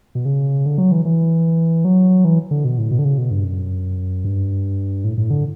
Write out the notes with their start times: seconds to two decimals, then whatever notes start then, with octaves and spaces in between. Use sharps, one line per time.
0.15 B2
0.25 C#3
0.65 D3
0.78 F#3
0.92 E3
1.05 E3
1.85 F#3
2.25 E3
2.51 D3
2.65 B2
2.78 A2
2.91 B2
2.99 D3
3.05 C#3
3.18 B2
3.31 G2
3.44 F#2
4.25 G2
5.04 A2
5.18 A2
5.30 D3